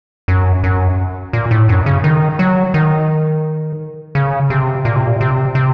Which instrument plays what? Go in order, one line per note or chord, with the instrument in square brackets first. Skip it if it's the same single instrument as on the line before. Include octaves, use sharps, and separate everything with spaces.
[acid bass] F#2
F#2
A#2
A2
F#2
C#3
D#3
F#3
D#3
C#3
C3
A#2
C3
A#2
C3
C3